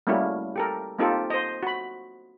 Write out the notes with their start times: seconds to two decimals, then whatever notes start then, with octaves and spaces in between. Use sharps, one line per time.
0.07 G3 A3 A#3 C#4 E4 F#4
0.56 G4 A4 A#4
0.99 A#3 C4 D#4 F4 G4 A4
1.30 C5 D#5
1.63 F#4 B5